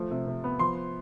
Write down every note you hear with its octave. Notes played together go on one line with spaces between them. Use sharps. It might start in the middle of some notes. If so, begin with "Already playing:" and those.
Already playing: F3 A3
C3
C3
B3
F3 C6